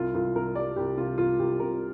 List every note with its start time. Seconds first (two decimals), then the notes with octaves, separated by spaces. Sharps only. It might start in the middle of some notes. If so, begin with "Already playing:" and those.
Already playing: C2 F4
0.14 C2 F4
0.35 C2 A#4
0.55 G3 D5
0.76 C2 G4
0.97 C3 F4
1.18 C2 F4
1.39 C2 G4
1.60 C3 A#4